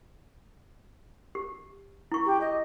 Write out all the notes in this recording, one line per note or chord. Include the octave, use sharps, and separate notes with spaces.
G4
E4 C#6
G4
D#5